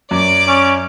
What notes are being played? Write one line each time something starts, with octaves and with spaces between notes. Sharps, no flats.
F#2 D5 D6
C#4